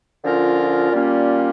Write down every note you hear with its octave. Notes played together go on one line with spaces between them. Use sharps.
D3 F3 C#4 F4 A#4
A#2 G3 A#3 C#4 F4